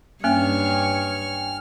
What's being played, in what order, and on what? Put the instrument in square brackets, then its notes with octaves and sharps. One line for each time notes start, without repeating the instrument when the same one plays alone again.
[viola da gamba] G2 C#5 [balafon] A#3 C#4 [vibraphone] G5 G#5 [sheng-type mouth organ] F6